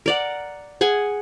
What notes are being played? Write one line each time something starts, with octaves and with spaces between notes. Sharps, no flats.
A#4 D5 F#5
G#4 F#5 G#5